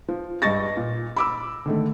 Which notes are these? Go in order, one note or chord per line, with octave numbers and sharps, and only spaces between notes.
F3
G2 D#5 C#6 A6 A#6
A#2
B5 D6 E6
D3 D#3 A3